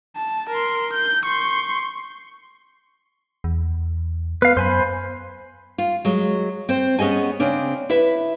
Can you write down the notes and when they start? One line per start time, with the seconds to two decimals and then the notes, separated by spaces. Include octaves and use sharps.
0.16 A5
0.50 A#4 C6
0.94 G6
1.26 C6 C#6
3.44 E2
4.42 B3 B4 F5
4.57 F#2 C5 G#5 B5
5.78 F4
6.05 F#3 G#3
6.69 C4 C5
6.99 B3 C#4 G#4 D#5 G#5
7.40 C#3 C4 D4
7.89 E4 B4 E5